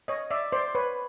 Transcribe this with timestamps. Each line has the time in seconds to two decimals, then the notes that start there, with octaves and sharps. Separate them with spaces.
0.08 C#5 D#5
0.31 D5 E5
0.52 C5 D5
0.75 B4 C#5